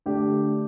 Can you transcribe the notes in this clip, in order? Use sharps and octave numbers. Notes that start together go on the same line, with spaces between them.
D3 A3 D4 G4